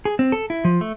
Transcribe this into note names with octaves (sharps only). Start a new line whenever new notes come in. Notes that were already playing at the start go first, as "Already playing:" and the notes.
G#4
C4
A4
E4
F3
A3